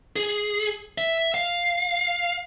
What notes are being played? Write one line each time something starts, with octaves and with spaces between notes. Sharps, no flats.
G#4
E5
F5